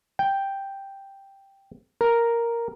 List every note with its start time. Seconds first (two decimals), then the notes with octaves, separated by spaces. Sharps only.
0.19 G5
2.01 A#4